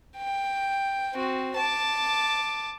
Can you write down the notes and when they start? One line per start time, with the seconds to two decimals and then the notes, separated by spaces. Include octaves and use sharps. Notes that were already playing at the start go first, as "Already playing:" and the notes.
0.17 G5
1.14 C4 F#4
1.56 A5 D6